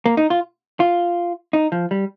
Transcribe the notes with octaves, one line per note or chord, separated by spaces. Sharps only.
A#3
D#4
F4
F4
D#4
F3
G3